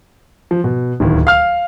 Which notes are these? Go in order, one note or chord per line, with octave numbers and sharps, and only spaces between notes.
F3
B2
D1 D#2
F5 F6